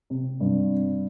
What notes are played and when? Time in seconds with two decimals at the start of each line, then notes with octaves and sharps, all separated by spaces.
0.10 C3
0.40 G2